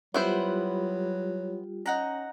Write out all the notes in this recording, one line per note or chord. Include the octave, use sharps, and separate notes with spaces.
F#3 G3 B3 E4 F4 G4 C5
C#4 D#4 F#5 A#5